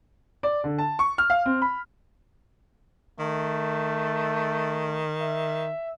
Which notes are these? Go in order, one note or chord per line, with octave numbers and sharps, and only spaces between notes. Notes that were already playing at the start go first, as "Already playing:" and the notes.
D5
D3
A5
C#6
F6
F5
C4
B5
D#3 A3
E5